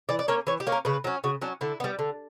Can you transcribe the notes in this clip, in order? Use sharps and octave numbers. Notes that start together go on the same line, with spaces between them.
E3 D5
D5
A#3 C#4 C#5
E3 C#5
G4
A#3 C#4
A#4
C#3 B4
F#3 C#4
C#3 F#4
F#3 C#4 D4
D3 E4
G3 B3
D3